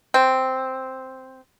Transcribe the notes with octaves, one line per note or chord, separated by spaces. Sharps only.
C4